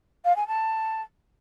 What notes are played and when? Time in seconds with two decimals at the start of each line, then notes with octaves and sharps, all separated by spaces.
0.24 F5
0.36 G#5
0.47 A5